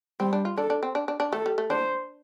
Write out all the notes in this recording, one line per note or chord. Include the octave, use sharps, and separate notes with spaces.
G3 C4
D4
F4
D4 A4
D4
C4
D4
D4
D4
A3 A4
G3
A3
D4 C5